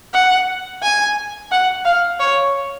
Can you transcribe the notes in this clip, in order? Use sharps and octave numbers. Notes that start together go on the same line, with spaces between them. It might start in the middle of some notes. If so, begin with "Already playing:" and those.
F#5
G#5
F#5
F5
C#5